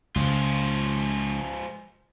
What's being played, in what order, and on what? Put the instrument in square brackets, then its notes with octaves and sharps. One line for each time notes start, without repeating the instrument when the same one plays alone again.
[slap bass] C#2 [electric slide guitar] F3 G#3 F4